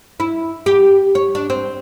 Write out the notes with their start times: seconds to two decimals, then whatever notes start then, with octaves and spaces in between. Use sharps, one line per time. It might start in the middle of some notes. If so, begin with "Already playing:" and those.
0.20 E4
0.66 G4
1.15 C#5
1.35 D4
1.50 C4